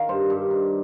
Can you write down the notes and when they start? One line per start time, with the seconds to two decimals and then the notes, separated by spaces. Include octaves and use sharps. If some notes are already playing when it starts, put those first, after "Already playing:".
Already playing: D#3 D#4 F5
0.09 G2 C5
0.30 G2
0.51 D#4